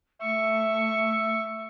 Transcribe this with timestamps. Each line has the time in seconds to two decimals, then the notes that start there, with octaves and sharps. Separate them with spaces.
0.22 A3 E5 C#6